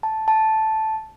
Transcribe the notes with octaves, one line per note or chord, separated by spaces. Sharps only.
A5
A5